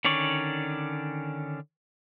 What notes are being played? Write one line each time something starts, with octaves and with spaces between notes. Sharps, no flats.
D3 D#3 C#4 D5 C#6